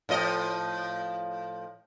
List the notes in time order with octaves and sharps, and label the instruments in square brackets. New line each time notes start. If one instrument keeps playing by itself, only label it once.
[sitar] A2 F3 D#5